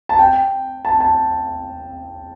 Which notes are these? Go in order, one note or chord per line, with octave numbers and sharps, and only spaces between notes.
A5
G5
A5
A5